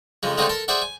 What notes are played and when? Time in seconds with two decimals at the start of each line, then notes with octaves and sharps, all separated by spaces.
0.23 F2 C#3 G#3
0.38 D3 G#3 A3 C4 D#4 F4
0.49 A4 A#4 A5
0.68 G#4 C5 D5 E5 F#5
0.82 G#5